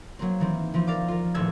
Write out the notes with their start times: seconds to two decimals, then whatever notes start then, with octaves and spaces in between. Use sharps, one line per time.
0.19 F#3 A#3 C4
0.40 D#3 E3 C4
0.74 E3 F3 C4
0.87 A#4 D5 F5 D6
1.08 F4 A#4
1.34 D#1 A1 E6 G#6